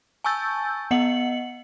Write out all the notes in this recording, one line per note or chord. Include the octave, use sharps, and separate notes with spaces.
G#5 A5 C#6 E6 G6 A6
B3 D#5 F#5 C#7 F#7